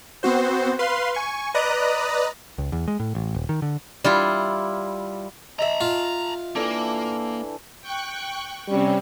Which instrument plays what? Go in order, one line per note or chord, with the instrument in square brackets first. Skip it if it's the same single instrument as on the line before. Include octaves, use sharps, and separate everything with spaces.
[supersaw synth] B3 C4 F#4 C5
B4 F5 C6
G#5 C#6
B4 D5 D#5 A#5 D#6 F#6
[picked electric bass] C#2
E2
G#3
A2
A1
D#1
D#3
D3
[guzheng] G3 E4 F4
[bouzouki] D#5 E5 [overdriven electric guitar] A#5 B5
[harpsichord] F4
[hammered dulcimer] E3 D4 A4 [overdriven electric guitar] A#3
[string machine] G5 C#6 F#6
[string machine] C3 C4 C#4 [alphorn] G3